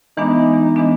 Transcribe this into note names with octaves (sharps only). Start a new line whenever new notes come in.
E3 G#3 B3 D4 D#4
E3 G#3 B3 D4